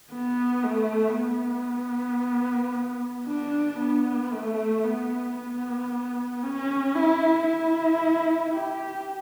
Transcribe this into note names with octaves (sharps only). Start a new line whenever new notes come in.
B3
A3
B3
D4
B3
A3
B3
B3
C#4
E4
E4
G4